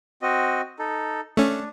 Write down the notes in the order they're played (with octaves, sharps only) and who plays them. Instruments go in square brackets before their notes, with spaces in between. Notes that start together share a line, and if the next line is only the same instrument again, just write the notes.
[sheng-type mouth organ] C4 F#4 D#5
D#4 A4
[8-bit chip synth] A3 C#4 [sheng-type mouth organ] D4